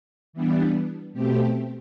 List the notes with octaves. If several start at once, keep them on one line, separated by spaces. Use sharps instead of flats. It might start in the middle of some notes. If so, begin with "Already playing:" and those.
E3 G3 B3 D4
B2 A3 C4 G4